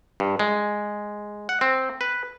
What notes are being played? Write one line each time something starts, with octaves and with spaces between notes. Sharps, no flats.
G2
G#3
F#5
C4
B4